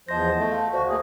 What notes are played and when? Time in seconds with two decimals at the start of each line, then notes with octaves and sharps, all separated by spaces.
0.09 E2 F3 C5 D#5 A#6
0.38 A3
0.52 F5
0.73 D2 F#4 C5 D5
0.89 A3 A#3 G#4